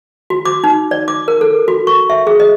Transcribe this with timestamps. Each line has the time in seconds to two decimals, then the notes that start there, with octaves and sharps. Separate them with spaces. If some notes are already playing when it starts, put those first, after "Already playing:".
0.30 F#4
0.45 D6
0.64 D#4
0.91 D5
1.08 D6
1.28 A#4
1.41 A4
1.68 F#4
1.87 C#6
2.10 E5
2.27 G#4
2.40 D#5